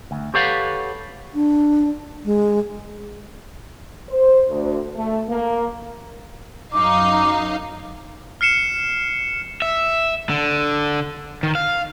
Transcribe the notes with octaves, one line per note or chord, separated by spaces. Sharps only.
D2
G4 A4 B4 C#5 F5 F#5
D4
G#3
C5
D2
A3
A#3
F#2 D#4 F5 D6
F6 C7 C#7 E7
E5
D3
D#3
F5